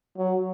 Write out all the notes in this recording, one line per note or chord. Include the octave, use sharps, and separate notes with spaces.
F#3